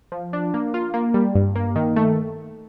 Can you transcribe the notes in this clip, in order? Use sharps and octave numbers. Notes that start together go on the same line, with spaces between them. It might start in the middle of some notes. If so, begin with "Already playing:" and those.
F3
D4
A#3
F4
A#3
G3
G2
A#3
D#3
A3